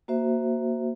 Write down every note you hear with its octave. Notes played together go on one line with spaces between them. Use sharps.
A#3 F#4 C5 E5